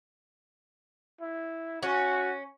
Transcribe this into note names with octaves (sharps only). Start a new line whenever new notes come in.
E4
C#4 F#4